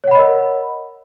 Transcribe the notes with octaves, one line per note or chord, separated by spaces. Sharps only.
A#4 C#5 D#5 F#5 B5